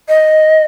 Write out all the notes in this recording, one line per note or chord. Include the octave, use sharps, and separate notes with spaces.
D#5